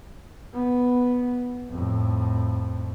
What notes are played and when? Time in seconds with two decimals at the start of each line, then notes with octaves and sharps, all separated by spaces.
0.53 B3
1.71 F2 A2